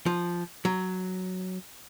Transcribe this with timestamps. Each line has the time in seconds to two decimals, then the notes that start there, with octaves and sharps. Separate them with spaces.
0.06 F3
0.65 F#3